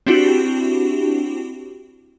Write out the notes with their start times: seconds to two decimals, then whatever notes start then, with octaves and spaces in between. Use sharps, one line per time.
0.07 C4 D4 E4 F#4 G4